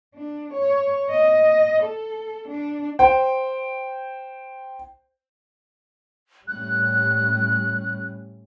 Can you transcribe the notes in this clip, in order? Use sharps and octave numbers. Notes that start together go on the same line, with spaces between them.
D4
C#5
D#5
A4
D4
C5 G5
A2 G3 C#4 F#6